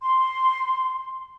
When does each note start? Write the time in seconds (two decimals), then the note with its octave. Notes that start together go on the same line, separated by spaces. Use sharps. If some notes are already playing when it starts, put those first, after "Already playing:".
0.01 C6